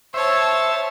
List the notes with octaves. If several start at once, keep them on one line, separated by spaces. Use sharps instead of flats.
C5 C#5 E5 A5